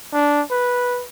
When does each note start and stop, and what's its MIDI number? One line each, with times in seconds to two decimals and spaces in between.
0.13 0.42 62
0.51 1.04 71